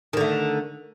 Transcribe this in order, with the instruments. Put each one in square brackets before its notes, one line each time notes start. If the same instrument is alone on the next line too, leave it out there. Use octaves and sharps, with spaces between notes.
[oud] D#3
D3
A3